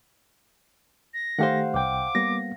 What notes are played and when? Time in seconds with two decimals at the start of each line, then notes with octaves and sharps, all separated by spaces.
1.14 A#6
1.39 D#3 A3 G4 C5 F5 F#5
1.74 C2 G5 D6
2.15 G3 A#3 B3 A#6